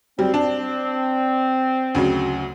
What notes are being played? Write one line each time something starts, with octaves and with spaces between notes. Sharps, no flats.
F#3 G3 C4
D4
D2 C#3 F#3